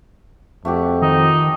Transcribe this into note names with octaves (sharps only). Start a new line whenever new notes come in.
F2 A3 F#4 G4
D#3 D#4